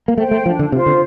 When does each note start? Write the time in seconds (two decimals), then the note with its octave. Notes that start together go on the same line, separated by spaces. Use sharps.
0.08 A#3
0.18 A3 C5 G5
0.31 A3
0.46 F3 D4
0.59 D3
0.72 C3 F4 C5
0.86 D3